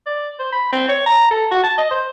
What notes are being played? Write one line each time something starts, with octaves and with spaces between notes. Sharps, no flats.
D5
C5
B5
C4
C#5
A#5
A4
F#4
A5
D#5
C5